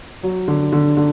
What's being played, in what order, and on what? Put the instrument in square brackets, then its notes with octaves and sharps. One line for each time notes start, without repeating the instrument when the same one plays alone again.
[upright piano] F#3
D3
D3
D3